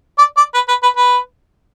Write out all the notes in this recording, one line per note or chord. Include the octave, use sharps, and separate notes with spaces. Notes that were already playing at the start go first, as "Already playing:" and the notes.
D5
D5
B4
B4
B4
B4